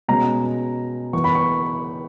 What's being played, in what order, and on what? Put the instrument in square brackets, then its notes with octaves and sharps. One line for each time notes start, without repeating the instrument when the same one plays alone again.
[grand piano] B2 G#3 C#4 A#5
E3 B3 C#6
B5
C#6